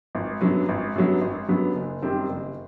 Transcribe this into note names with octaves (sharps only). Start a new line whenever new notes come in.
G#1
F#2 D3 F#3 B3
G#1
F#2 D3 F#3 B3
G#1
F#2 D3 F#3 B3
F#1
F#2 D#3 G3 C4
F#1